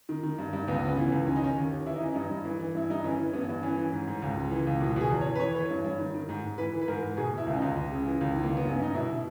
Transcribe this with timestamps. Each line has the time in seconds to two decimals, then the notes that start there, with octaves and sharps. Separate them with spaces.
0.09 D#3
0.23 D#3
0.38 G2
0.53 G2
0.68 C#2 B3
0.83 C#3 B3
0.97 E3
1.07 C#4
1.12 C#2
1.27 D#3 C#4
1.36 D#4
1.41 D#3 C#4
1.57 D#2
1.71 D#2
1.86 E3 E4
1.95 D#4
2.01 E3 C#4
2.13 G2 D#4
2.30 G2
2.45 E3
2.59 E3
2.75 G2 E4
2.90 G2 D#4
3.04 E3 C#4
3.19 E3
3.34 G2 B3
3.49 G2
3.63 E3 C#4
3.77 E3
3.92 G#2
4.07 G#2
4.22 C#2
4.37 C#3
4.51 E3
4.67 C#2
4.81 B2
4.96 B2 G#4
5.11 E2
5.21 C#5
5.26 E2
5.35 B4
5.40 E3 C#5
5.55 E3
5.70 G2
5.84 G2
5.99 D#3
6.14 D#3
6.29 G#2
6.44 G#2
6.58 E3 B4
6.73 E3
6.82 B4
6.88 G#2 A#4
7.03 G#2
7.17 B2 G#4
7.33 B2 E4
7.46 C#2
7.53 C#4
7.57 D#4
7.62 C#2
7.76 C#2
7.92 C#3
8.06 E3
8.21 C#2
8.36 D#3
8.43 A#3
8.50 D#3
8.57 B3
8.65 G2 C#4
8.80 G2 D#4
8.94 B2 E4
9.09 B2